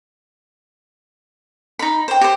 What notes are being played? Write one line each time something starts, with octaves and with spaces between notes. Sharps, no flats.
D#4 B5
C5 G5
G4 C5